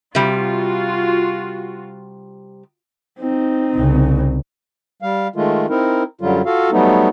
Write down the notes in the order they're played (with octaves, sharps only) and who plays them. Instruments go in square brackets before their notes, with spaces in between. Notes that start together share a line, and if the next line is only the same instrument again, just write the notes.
[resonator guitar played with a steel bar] C3 G3 [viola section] F4 F#4
[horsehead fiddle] C4 D#4
[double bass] C2 C#3
[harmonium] G3 F5
D#3 G#3 A3 F4
C4 D#4 E4 A#4
F#2 D3 F#3 G3 F4
F4 F#4 A4 F5
F#3 G3 A3 B3 D#4